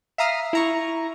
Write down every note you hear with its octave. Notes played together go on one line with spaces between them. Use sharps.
E5 F5 A#5 D#6 F6
E4 A#5 C#6